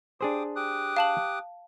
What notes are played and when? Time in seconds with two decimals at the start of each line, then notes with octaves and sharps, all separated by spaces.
0.21 D4 G4 G#4 C5 D#6
0.56 G4 D#6 F#6
0.96 F5 A5 F#7